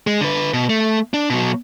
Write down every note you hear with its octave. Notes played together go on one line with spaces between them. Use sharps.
G#3
D3 B4
B2
A3
D4
B2 F#3